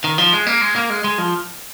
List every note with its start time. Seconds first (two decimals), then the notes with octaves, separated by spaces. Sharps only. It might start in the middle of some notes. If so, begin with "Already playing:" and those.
0.04 D#3
0.18 F3
0.33 G#3
0.47 A#3
0.61 G#3
0.76 A#3
0.90 G#3
1.04 G#3
1.18 F3